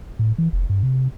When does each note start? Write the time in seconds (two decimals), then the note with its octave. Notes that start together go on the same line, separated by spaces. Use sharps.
0.19 A2
0.38 E3
0.53 F1
0.70 G2
0.83 C3